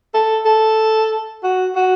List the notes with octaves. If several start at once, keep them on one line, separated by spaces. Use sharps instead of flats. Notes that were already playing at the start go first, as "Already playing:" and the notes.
A4
A4
F#4
F#4